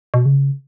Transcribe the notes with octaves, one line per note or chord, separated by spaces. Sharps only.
B2
C#3